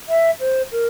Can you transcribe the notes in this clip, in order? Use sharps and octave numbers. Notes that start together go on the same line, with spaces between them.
E5
C5
A#4